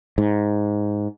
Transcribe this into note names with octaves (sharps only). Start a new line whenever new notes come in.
G#2